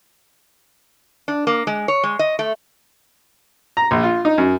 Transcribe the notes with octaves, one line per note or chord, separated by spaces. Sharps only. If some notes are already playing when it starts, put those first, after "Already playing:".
D4
A#3
G#3
C#5
G#3
D#5
A3
A#5
A#1
F4
D#4
F#2